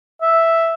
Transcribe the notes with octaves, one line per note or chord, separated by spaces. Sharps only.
E5